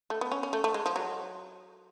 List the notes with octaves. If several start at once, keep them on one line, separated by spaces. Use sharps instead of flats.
A3
B3
C#4
C#4
A3
A3
G#3
F3
F#3